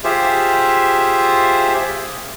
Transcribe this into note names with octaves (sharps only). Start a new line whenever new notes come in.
F4 G4 G#4 C5 E5